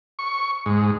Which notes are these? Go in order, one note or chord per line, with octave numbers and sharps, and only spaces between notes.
C#6
G#2